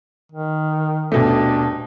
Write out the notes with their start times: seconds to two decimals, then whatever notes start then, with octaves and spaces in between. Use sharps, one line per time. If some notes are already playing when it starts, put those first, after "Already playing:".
0.32 D#3
1.12 D#1 B2 A3 D4